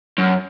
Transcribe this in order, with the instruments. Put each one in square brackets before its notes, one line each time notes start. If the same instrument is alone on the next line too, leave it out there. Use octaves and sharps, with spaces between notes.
[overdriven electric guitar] F#2